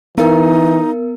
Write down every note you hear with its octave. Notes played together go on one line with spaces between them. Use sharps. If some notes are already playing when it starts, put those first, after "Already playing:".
E3 B3 D#4 A#4